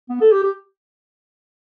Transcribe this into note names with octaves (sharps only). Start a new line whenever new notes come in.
B3
A4
G4
G4